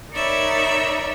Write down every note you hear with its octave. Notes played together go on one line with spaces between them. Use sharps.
D#4 A#4 C#5 D5 E5 B5